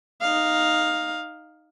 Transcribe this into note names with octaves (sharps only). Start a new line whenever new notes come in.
D#4 F5